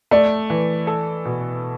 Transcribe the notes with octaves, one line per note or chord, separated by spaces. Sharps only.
A3 D5
E3
A4
B2